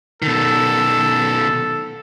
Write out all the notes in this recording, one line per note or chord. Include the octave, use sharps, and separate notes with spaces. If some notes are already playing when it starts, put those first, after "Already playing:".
B2 D#3 A4